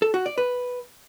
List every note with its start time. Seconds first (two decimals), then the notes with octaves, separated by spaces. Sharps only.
0.02 A4
0.14 F#4
0.26 D5
0.38 B4